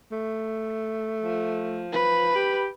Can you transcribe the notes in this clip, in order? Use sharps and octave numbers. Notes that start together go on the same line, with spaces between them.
A3
F3
B4 B5
G4